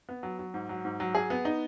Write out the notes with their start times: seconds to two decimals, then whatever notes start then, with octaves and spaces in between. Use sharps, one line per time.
0.09 B3
0.23 F#3
0.39 F#3
0.54 G#2
0.69 F#3
0.85 G#2
1.00 F#3
1.15 G#4
1.30 B3
1.45 D#4